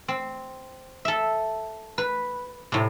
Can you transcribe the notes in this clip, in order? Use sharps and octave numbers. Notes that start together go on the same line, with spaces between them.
C4
A4 E5
B4
A2 C3